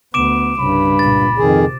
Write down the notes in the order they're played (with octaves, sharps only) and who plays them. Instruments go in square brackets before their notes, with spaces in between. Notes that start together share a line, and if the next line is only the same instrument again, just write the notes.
[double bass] D2 B3 [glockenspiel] D6 D7 E7
[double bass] C2 C#3 [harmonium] G2 [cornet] B5
[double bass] C#2 A#2 [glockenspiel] A6
[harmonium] F2 D#3 G#4 [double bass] C3